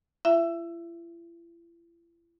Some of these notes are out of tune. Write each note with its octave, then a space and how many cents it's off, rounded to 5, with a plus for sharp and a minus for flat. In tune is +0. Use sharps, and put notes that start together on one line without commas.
E4 +45 E5 +25